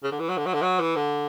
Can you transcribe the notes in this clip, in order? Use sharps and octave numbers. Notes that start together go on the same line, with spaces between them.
C#3
D3
E3
F#3
D3
F#3
D3
F#3
E3
D3